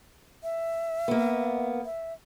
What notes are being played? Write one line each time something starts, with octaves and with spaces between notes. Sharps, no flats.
E5
A#3 B3
E5